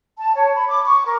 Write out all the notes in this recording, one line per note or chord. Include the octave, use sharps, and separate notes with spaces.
A5
C#5
B5
D6
C#6
A#4